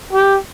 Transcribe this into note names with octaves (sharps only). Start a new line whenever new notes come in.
G4